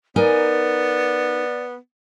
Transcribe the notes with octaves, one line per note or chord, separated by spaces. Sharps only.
B3 D#4 A#4 D5 G#5